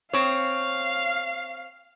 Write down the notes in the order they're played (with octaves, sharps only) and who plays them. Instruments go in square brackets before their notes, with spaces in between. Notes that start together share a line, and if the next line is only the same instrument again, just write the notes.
[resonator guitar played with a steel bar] C4 C#5 [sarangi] F5